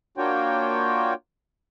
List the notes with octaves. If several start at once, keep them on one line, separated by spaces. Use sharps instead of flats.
A#3 D4 F4 F#4 C#5 G5